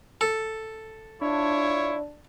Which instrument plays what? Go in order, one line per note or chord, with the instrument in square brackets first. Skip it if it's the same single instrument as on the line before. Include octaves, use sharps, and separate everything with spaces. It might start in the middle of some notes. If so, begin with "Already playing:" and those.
[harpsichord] A4
[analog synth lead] D4 [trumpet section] E4 F4 C#5